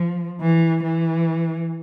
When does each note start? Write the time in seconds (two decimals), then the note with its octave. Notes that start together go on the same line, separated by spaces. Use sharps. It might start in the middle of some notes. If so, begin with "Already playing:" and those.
Already playing: F3
0.42 E3
0.83 E3